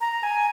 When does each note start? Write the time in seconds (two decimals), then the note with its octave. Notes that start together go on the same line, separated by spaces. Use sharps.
0.01 A#5
0.23 G#5